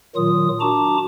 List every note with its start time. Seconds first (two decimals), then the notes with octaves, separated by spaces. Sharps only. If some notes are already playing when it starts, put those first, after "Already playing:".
0.16 A#2 D#3 F#3 F4 D#6
0.60 D4 F#4 A5 A#5 D6